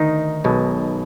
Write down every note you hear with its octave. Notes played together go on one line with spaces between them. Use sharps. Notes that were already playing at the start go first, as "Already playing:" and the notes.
Already playing: D2 D#3 D#4
B1 B2 G#3